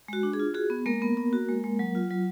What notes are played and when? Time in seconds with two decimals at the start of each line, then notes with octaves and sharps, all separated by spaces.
0.08 G#3 F#4
0.23 D4
0.33 G#4
0.39 F4
0.54 F#4 G#4
0.70 B3
0.86 G#3 A#3 A#4
1.02 B3
1.17 B3
1.33 F#4
1.49 G#3
1.64 G#3
1.79 F#3
1.95 F4
2.10 F#3